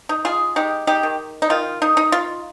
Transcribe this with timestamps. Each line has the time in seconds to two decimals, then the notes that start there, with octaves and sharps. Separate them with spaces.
0.09 D#4
0.25 F4 G#4
0.56 G#3 D#4 G4
0.87 D#4 G4
1.03 D#3
1.42 D#4
1.50 D#3 F4
1.82 D#4
1.97 D#4
2.12 F4